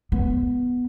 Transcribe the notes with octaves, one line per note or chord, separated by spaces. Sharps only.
B3